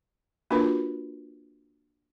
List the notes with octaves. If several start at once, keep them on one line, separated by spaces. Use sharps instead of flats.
A#3 D4 F4 F#4 A#4 B4